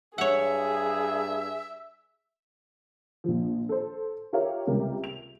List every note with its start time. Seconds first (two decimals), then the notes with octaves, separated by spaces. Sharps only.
0.18 G2 G#4 C#5 E5 F#5
3.24 A#1 F3
3.69 A4 C5
4.33 F4 G4 A#4 C#5 E5 F5
4.67 C#2 C3 G3 G4 A#4
5.04 F7